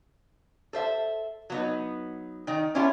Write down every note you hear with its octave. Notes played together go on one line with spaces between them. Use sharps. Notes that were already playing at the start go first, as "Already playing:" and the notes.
A4 C5 E5
F#3 B3 D#4
D#3 D#4
B3 C#4 D4 E4 F4 G4